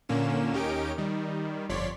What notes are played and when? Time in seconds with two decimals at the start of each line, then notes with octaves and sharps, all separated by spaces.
0.09 A#2 D3 A#3 C#4 E7
0.53 D#2 C#4 D#4 G4 A#4 D7
0.98 D#3 G3
1.69 G1 F2 C#5 D5 C6 B6